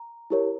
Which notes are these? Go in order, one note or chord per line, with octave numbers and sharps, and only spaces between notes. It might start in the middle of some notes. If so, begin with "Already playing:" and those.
Already playing: A#5
E4 G4 A#4 C#5